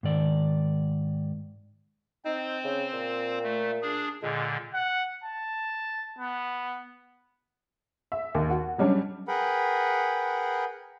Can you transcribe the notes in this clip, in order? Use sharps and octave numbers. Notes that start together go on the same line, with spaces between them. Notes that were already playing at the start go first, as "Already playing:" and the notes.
G#2 D#3 D5
C4 D#4 C5
C#3
A#2
A3
D4 G#4
A#2 D3 G#3
F#5
A5
B3
E5
D#2
F#4
F#3 G3 C#4 D4
G#4 A#4 B4 F#5 G5 B5